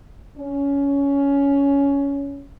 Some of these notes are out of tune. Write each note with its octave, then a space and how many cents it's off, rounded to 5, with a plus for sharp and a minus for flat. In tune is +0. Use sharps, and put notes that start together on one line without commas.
C#4 +15